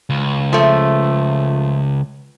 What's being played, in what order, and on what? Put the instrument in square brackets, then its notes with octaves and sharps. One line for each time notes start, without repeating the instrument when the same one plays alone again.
[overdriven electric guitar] C#2
[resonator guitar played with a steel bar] F3 A3